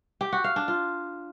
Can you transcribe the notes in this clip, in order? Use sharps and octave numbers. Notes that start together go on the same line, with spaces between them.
G4
F#4
F5
D4
F4